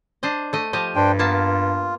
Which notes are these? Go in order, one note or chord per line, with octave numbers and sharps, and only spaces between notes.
D4 C5 D#5
A3 D#5
F3 G4 D#5
G2 D4 C5 G5
A#3 B3 F4 A5